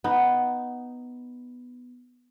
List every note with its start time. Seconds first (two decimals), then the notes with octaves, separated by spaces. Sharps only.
0.04 B3 D#4